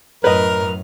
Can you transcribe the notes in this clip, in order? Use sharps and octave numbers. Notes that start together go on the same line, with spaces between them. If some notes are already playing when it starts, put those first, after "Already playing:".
F#2 A2 A#4 B4 D#5 F6